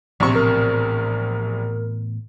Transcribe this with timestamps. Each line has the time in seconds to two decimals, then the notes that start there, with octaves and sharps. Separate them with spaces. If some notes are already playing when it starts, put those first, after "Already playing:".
0.20 A#1 A2 C3 E3 B3 C#6
0.35 A#4